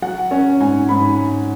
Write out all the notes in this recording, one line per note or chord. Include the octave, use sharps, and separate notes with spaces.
F#3 F#5
C#4
G#2 G#5
G#2 B5